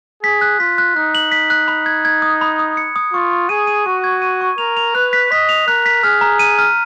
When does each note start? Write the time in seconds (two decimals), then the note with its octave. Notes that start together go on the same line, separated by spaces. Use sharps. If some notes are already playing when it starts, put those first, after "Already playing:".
0.23 G#4 B6
0.41 F#6
0.60 F4 B6
0.78 F#6
0.96 D#4 F#6
1.15 F#7
1.32 B6
1.50 F#6
1.68 B5
1.86 G#6
2.05 G#6
2.22 D#6
2.41 B5
2.59 D#6
2.77 C#7
2.96 D#6
3.13 F4 C#6
3.32 C#6
3.49 G#4 D#7
3.67 D#7
3.86 F#4 C#6
4.04 G#6
4.22 D#7
4.41 C#6
4.58 A#4 F7
4.77 F7
4.95 B4 F#6
5.13 B6
5.31 D#5 B6
5.49 F7
5.68 A#4 F#6
5.86 B6
6.04 G#4 F6
6.21 A#5
6.39 D#7
6.59 F6